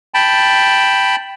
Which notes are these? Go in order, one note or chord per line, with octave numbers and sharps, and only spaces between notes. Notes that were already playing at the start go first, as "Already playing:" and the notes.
G5 A5 B5